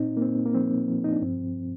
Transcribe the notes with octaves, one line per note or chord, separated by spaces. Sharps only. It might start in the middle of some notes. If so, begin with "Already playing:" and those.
Already playing: A#2 C4 D#4
A#3
A#2 C4
A#3
F3 C4
F3
D#4
D4
G2 C4